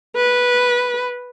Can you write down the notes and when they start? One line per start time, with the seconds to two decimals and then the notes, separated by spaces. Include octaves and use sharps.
0.16 B4